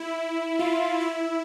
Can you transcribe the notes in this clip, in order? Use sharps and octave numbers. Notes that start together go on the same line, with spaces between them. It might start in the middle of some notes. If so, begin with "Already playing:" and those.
Already playing: E4
F4
E4